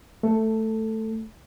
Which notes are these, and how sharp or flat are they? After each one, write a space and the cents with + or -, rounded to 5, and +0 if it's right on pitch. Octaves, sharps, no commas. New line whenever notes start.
A3 +0 A4 +10